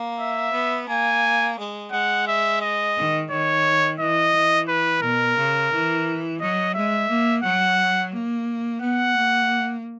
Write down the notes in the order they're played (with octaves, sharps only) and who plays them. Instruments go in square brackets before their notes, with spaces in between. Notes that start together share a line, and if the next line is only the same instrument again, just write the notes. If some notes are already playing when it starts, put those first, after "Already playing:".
Already playing: [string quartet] A#3
[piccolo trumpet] E5
[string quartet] B3
[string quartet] A#3 [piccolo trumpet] G#5
[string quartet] G#3
[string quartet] G#3 [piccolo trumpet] F#5
[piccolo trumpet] E5
D#5
[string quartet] D#3
[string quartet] D#3 [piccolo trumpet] C#5
[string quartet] E3 [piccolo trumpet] D#5
[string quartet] E3
[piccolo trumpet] B4
[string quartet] B2 [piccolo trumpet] A#4
[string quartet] C#3
E3
[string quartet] F#3 [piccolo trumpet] D#5
[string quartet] G#3 [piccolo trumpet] E5
[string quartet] A#3
[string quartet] F#3 [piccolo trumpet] F#5
[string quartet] A#3
[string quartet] B3 [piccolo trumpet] F#5
[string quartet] A#3